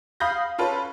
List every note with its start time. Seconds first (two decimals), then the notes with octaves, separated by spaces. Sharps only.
0.20 F5 B5 D#6 G6 A#6
0.58 C#4 F4 A4 B4